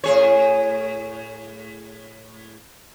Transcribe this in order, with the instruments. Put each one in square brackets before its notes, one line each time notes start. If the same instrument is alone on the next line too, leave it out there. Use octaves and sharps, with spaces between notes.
[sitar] A2 G#4 C#5